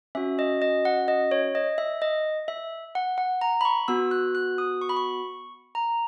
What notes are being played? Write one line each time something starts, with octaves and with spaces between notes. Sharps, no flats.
C#4 F#4 E5
D#5
D#5
F#5
D#5
C#5
D#5
E5
D#5
E5
F#5
F#5
A#5
B5
C#6
B3 F#4 E6
F#6
F#6
D#6
C#6
B5
C#6
A#5